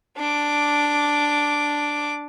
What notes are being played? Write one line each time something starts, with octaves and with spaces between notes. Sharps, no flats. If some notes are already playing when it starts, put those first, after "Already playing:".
D4 D6